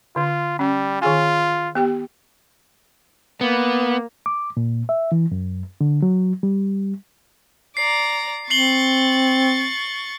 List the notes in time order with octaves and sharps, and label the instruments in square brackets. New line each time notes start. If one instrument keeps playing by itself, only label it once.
[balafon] D3 [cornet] F4
[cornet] G3 [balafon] C#4
[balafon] D#3 G#4 G#5 [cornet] F4
[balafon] B3 G4 G5
[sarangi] A#3 [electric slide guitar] B3
[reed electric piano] D6
A#2
E5
E3
F#2
D3
F#3
G3
[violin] D5 A#5 [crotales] C7
[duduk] C4 [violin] C#6 A6 [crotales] C7 F#7 G7